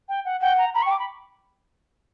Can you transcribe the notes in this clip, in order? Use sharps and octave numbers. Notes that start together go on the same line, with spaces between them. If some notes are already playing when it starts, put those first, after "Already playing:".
G5
F#5
F#5 G5
A#5
A#5 B5
C#6
G5
D6
B5